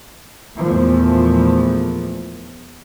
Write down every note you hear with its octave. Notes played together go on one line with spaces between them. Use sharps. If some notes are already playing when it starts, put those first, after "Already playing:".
E2 A#2 F3 A3